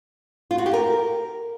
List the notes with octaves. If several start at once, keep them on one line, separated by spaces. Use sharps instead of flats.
F4
F#4
G4
A#4